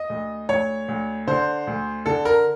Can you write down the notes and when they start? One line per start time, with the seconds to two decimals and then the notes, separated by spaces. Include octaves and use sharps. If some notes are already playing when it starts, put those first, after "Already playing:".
Already playing: D#5
0.10 D2
0.49 D2 C#5
0.88 D2
1.27 D3 C5
1.67 D2
2.06 D3 A4
2.25 A#4